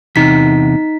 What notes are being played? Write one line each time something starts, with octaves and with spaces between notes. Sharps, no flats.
E2 C3 D#4 B6